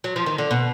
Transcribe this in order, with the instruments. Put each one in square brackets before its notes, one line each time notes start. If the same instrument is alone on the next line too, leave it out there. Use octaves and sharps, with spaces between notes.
[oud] F#3
F3
D#3
D3
B2